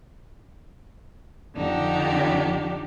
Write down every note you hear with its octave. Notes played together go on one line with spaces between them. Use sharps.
F2 D3 D4 D#4 G4